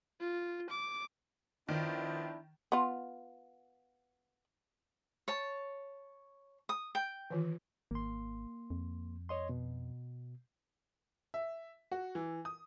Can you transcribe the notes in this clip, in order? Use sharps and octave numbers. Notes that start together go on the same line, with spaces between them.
F4
D6
D#3 F3 B3 D4 E4
B3 F4
C#5 A5
D#6
G5
D#3 E3 F4
G#1 A#3 C6
F2
C#5 D#5 C6
B2
E5
F#4
E3
D#6